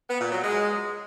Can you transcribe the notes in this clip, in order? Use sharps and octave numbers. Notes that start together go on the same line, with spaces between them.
B3
A#2
F#3
G#3